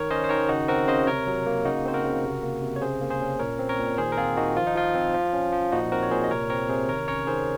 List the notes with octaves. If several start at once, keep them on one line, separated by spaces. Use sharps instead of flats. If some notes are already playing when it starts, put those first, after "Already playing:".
Already playing: D#3 A#4 C#5
C#4 C5 D#5
C5
D#3 A#4 C#5
C#3 D#4 F#4
C4 F#4 A#4
C#3 C5 D#5
C3 A#4 C#5
F#3
A#3
C#3 D#4 F#4
C4 C5
F#4 A#4
C#3
C3
A#3
C3
C#5
C#3 G#4 C5
A#3
G#4 C5
C#4
A#2 A#4 C#5
C4
A#4 C#5
A#2
D#3 G#4 C5
A#4
C4 F4 G#4
D#3 D#4 F#4
F3 F4
D#4
F3 F4
C4
F3
C#4
F3
A#2 D#4 F#4
C4 F#4 A#4
C#5
A#2 G#4 C5
D#5
C3 A#4 C#5
C4 A#4 C#5
C3 G#4 C5
D#3 A#4 C#5
C#4 A#4 C#5
D#3 G#4 C5